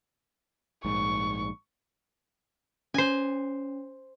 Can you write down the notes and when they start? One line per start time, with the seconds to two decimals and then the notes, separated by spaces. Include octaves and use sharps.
0.85 A#1 G#2 C#6
2.94 C#4 C5 G#5